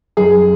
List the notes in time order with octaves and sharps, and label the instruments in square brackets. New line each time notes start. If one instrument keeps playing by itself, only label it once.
[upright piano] F#2 G#4